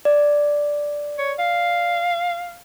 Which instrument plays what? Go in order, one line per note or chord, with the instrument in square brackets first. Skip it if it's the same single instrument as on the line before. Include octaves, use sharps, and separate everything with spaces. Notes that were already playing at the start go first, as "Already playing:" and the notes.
[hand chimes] D5
[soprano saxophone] C#5
F5